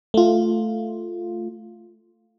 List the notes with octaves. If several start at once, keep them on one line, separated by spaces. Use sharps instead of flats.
A3 F4